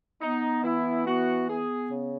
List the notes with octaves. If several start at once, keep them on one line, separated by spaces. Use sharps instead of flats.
B3 D#4
E3 E4
B3 F#4
B3 G#4
C#3